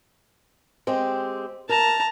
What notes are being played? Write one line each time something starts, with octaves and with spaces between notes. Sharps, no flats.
G#3 C4 G4
A#4 A5 A#5